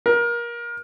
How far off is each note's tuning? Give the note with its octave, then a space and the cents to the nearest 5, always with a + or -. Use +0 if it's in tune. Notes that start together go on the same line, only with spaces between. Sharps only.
A#4 +25